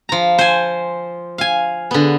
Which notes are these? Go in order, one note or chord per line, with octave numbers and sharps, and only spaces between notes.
F3 A#5
C5 G#5
F5 G#5
D3 B3